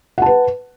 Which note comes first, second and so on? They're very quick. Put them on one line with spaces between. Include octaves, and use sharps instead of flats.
F#5 A5 B4